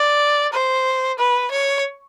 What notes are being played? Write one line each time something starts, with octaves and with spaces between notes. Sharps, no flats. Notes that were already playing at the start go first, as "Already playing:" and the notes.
Already playing: D5
C5
B4
C#5